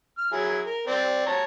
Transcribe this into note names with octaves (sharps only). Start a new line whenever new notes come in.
F6
F#3 E4 G#4
A#4
C4 D5
C#5 A5 A#5